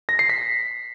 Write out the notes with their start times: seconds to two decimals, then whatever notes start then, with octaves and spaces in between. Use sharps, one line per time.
0.09 A#6
0.19 C7
0.29 B6